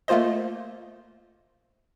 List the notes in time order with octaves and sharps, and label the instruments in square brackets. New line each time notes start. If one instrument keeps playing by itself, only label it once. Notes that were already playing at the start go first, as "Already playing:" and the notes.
[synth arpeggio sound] A3 A#3 F4 C5 D#5